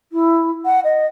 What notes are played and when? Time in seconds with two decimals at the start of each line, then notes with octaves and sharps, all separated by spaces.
0.12 E4
0.65 F#5
0.84 D#5